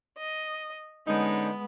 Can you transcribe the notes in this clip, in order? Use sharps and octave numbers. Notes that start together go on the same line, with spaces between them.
D#5
D3 G#3 B3 C#4 D#4